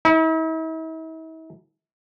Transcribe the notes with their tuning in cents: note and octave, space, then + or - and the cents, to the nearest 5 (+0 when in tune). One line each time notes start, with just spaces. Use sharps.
E4 -45